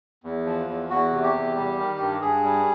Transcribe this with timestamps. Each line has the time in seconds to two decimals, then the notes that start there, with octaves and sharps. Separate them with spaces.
0.24 E2
0.45 F3
0.67 E2
0.90 E2 F#4
1.11 C3
1.23 G4
1.34 E2
1.56 G3
1.78 D#3
2.00 G2
2.21 G2 G#4
2.44 G3